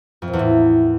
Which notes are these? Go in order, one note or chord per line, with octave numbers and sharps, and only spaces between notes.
F2
A#2
E2
A2